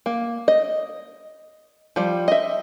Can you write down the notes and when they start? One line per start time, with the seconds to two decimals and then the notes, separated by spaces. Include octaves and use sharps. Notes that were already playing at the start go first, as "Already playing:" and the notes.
0.06 A#3
0.48 D#5
1.96 F3 G3
2.28 D#5 E5